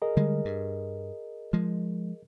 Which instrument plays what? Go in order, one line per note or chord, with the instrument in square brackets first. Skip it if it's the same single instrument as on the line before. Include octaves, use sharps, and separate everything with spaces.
[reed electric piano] G#4 A#4 D#5
[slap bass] D3 G3 G#3
G2
F3 G#3